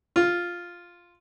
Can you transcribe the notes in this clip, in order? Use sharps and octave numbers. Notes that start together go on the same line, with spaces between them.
F4